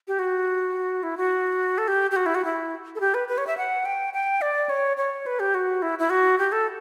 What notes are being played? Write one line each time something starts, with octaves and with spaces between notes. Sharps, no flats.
G4
F#4
E4
F#4
A4
G4
G4
F#4
E4
F#4
E4
A4
G4
B4
B4
C#5
E5
F#5
G5
G5
D5
C#5
C#5
B4
G4
F#4
E4
E4
F#4
G4
A4